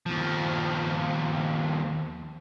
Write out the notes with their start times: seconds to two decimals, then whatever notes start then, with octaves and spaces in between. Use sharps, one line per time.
0.06 D#2 F3